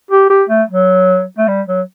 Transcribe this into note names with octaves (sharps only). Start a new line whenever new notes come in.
G4
G4
A3
F#3
A3
G3
F#3